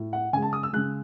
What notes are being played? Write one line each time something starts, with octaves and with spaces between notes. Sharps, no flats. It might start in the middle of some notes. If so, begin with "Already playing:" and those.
Already playing: A2
F#5
C#3 G#3 G#5
A5
D#6
E6
C#3 G#3 F#6